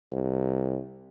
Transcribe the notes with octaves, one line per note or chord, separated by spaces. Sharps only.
C2